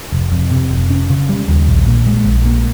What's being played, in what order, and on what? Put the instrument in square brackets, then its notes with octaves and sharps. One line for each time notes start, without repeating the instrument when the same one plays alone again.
[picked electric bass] F1
F2
C3
F1
C#4
C#3
G3
D#2
A#1
A#2
G#3
A#1
A#3